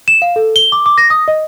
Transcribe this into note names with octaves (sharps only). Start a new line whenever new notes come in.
E7
F5
A4
G7
D6
D6
A#6
D#6
D#5